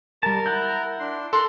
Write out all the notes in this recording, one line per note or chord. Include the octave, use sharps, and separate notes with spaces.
G3 A#4 A5
E4 F#5 G6
D4 C6
A4 A#4 C6 F#6